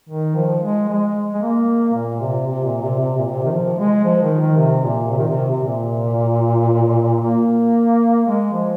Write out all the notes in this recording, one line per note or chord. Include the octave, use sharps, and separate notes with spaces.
D#3
F3
G#3
G#3
G#3
A#3
A#2
C3
C3
A#2
C3
C3
A#2
C3
D#3
F3
G#3
F3
D#3
D#3
C3
A#2
C3
D#3
C3
C3
A#2
A#3
G#3
F3